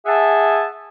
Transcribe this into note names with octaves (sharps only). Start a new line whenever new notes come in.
G#4 E5 F#5 A5